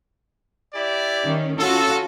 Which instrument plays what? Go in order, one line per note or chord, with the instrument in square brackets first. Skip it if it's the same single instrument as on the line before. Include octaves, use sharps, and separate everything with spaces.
[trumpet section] E4 G4 D5
[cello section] D#3 C#4
[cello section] C#4 F4 F#4 [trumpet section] A4